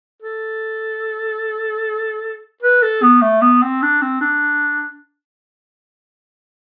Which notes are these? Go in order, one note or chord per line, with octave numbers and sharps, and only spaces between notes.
A4
B4
A4
B3
A3
B3
C4
D4
C4
D4